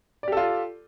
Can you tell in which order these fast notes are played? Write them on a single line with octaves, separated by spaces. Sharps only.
D5 G4 A4 F4